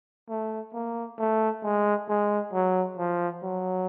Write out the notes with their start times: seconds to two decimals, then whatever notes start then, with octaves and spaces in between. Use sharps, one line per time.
0.29 A3
0.74 A#3
1.19 A3
1.63 G#3
2.09 G#3
2.53 F#3
2.98 F3
3.43 F#3